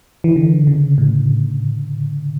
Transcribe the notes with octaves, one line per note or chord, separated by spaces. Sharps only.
E3
D3
C#3
A2